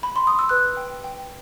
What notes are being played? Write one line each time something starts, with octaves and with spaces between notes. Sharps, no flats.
B5
C6
D#6
E6
B4 F#6
G5
G5